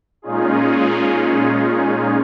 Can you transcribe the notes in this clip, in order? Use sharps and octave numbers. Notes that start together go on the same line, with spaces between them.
A#2 G#3 C#4 D#4 F4 G#4